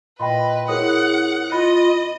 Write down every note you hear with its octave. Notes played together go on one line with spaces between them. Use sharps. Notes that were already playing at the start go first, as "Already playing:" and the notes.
A#2 B4 D#5 G5 B5 C6
C4 E4 F#4 G#4 A#4 C#5 F#5 D#6
F4 D#5 B5 A6